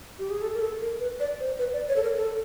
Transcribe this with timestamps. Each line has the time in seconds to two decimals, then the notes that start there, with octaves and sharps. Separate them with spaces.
0.19 G4
0.30 G#4
0.42 A4
0.54 A#4
0.60 A4
0.80 A#4
1.00 B4
1.20 D5
1.40 C5
1.59 B4
1.73 D5
1.89 C#5
1.96 A4
2.03 A#4
2.18 A4